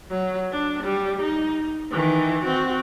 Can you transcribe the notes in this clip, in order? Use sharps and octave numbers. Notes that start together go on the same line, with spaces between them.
F#3
D4
G3
D#4
D#3 E3
C4 F#4